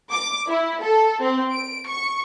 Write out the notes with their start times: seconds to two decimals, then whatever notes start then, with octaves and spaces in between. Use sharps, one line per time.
0.12 D6
0.49 E4
0.83 A4
1.22 C4
1.53 D7
1.87 C#6